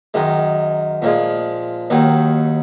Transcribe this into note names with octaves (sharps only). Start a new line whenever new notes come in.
F#2 D#3 G#3
A#2 F3 G#3
D#2 D#3 F#3